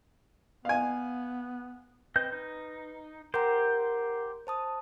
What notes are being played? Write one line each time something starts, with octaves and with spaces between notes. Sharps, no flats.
B3 F5 G#5
C4 B4 D#5 G6
D#4
G4 A#4 C5 F#5 A#5
C5 A5 D#6